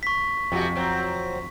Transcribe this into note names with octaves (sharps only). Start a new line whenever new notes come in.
C#6 B6
F2 C3 G#3 F#4
F#3 C4